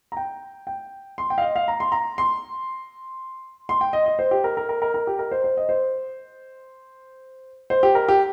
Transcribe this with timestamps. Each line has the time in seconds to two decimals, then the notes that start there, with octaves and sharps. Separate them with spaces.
0.12 A#5
0.17 G5
0.67 G5
1.18 C6
1.30 G5
1.38 F5
1.42 D#5
1.56 F5
1.68 A#5
1.80 C6
1.92 A#5
2.18 C6
3.69 C6
3.81 G5
3.93 D#5
4.06 D#5
4.19 C5
4.31 G4
4.44 A#4
4.57 A#4
4.69 A#4
4.82 A#4
4.94 A#4
5.07 G4
5.19 A#4
5.32 C5
5.44 C5
5.57 D#5
5.69 C5
7.70 C5
7.83 G4
7.95 A#4
8.08 G4